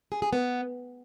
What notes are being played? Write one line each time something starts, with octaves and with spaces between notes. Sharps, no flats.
G#4
G#4
B3